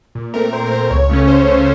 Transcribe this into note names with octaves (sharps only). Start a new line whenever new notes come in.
A#2
A3 C4 A#4
A#2 C5
A#4
A3 C4 C5
C#2 C#5
C#3 A3 C#4
C#2 C5
C#3 A3 C#4